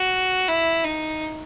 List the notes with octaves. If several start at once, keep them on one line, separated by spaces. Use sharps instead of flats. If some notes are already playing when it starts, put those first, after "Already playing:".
Already playing: F#4
E4
D#4